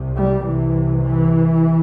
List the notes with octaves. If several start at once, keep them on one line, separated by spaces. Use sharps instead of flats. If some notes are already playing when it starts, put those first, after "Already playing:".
Already playing: C2 C3
G3
C2 C3 E3
E3